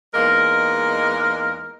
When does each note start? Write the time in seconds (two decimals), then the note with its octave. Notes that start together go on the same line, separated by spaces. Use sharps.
0.15 E2 G#3 A#3 D#4 A#4